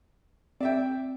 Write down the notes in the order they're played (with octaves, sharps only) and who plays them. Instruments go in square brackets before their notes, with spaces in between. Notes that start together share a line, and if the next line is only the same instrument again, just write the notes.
[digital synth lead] C4 [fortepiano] D5 E5 G5